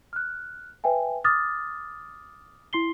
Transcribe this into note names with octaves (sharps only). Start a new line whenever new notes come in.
F6 F#6
B4 E5 G5 G#5
D6 D#6 F6 A6
E4 C6 C7 G7